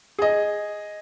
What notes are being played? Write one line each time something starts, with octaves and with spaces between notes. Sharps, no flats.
G#4 D#5